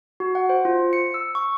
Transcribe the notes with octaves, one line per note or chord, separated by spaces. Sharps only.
F#4
F#5
C5
F4
C#7
E6
C#6